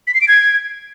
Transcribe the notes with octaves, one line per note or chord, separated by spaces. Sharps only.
B6
C7
D7
G#6